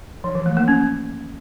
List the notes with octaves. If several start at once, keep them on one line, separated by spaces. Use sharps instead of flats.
F3
E3
A3
A#3
C#4